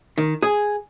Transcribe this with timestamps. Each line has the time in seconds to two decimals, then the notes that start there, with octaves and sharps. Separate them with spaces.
0.18 D#3
0.43 G#4